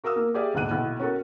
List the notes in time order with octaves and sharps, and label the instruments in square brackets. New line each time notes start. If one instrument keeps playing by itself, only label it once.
[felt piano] F#4 A#4 F5 D#6 E6
A#3 A#4
G4 G#4 D5 E5 F5
D#1 B1 G#2 D3 F#6 D#7
B1 E4 F5
C#4 F#4 A4 A#4